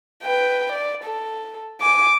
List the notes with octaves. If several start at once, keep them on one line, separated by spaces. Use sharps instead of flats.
B4 G5
D5
A4
G#5 D6